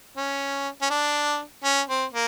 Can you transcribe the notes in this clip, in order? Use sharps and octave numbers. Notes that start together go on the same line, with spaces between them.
C#4
C#4
D4
C#4
C4
A#3